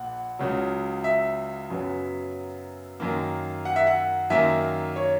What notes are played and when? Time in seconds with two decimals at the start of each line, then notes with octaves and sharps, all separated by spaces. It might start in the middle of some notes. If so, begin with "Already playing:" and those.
Already playing: A#1 A#2 F#5
0.39 C#2 C#3 F#3
1.04 E5
1.70 F#2 C#3 F#3 B3
3.00 F#2 D#3 A#3
3.65 F#5
3.76 E5
3.87 F#5
4.30 F#2 D#3 A#3 E5
4.96 C#5